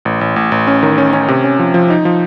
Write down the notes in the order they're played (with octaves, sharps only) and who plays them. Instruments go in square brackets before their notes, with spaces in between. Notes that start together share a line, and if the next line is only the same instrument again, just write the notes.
[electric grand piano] A1
A1
A1
A1
C#4
D#3
C#4
C#4
C3
C#4
F3
F3
D#4
F3